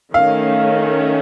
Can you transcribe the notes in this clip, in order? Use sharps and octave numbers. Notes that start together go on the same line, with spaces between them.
D#3 A3 C#4 F5